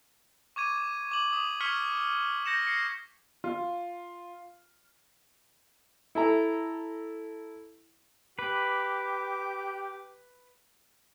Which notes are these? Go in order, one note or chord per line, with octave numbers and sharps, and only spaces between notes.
C#6 D6 G#6 D#7
D6 F#7
D#6
C#6 F6 G#6 B6 C#7 G7
G6 A#6 C#7 E7
A#6 C7 C#7
F4
E4 A4 A#5
G4 B4 D6